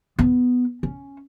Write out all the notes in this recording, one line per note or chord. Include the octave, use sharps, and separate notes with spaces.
B3
C#4